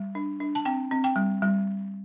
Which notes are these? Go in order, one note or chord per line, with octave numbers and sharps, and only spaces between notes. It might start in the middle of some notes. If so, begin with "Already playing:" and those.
Already playing: G3
D4
D4
A5
C4 G5
C4
G5
G3
G3